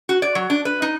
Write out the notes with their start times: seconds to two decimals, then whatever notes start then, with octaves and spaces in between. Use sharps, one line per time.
0.09 F#4
0.22 D5
0.35 F#3
0.50 D4
0.65 B4
0.82 D#4